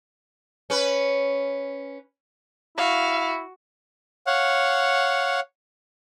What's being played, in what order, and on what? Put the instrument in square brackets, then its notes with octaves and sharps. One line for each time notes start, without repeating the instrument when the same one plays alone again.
[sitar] C#4 B4
[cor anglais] E4 [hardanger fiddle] F#4 [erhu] F5
[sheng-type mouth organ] C#5 F5 F#5